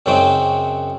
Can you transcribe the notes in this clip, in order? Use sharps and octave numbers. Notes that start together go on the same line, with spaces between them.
F#2 C#3 F#3 C4 D#4 G5